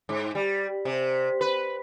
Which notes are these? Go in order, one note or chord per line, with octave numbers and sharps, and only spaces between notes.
G#2
G3
C3
B4